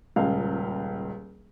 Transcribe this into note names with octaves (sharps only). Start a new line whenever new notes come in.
D#1 C#2 F5